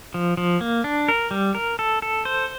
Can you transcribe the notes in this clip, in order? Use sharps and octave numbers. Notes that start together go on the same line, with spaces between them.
F3
F3
A#3
D4
A#4
G3
A#4
A4
A4
C5